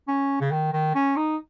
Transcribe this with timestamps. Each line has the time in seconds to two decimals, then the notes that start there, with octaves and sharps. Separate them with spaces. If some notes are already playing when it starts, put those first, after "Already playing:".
0.08 C#4
0.41 C#3
0.52 D#3
0.73 D#3
0.95 C#4
1.17 D#4